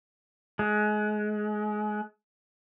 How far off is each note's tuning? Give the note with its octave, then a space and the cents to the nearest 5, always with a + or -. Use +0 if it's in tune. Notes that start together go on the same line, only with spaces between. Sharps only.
G#3 +25